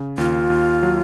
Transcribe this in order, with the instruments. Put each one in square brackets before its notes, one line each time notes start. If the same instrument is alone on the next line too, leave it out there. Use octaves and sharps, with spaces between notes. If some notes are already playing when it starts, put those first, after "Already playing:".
Already playing: [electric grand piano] C#3
[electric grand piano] D#2 [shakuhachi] F4
[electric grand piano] D#2
F#3